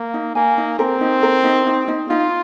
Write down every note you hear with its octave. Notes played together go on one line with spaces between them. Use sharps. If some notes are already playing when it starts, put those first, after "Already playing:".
Already playing: A#3
D#4
A#3 G#5
D#4
C4 A#4
D#4
A#4
D#4
D#4
D#4
D#4 F4